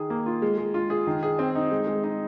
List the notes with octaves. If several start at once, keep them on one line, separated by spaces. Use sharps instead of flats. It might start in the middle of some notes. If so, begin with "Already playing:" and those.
Already playing: D#3 G#4
A#3
F4
G#3
G#3
F4
G#4
D#3
G#4
C4
D#4
G#3
G#3
D#4